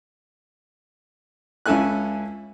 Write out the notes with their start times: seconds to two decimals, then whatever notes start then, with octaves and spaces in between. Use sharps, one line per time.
1.66 C#2 C#4 E4 A4 G#5 F#6